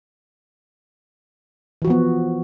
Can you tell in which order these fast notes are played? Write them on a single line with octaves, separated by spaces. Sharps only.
E3 F#4 F3 B3